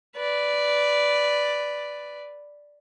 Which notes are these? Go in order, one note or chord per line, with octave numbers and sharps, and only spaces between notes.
B4 D5